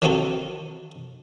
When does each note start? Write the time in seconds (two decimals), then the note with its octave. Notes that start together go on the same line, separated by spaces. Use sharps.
0.02 D#3 F3 C4 D#4 F#4 A4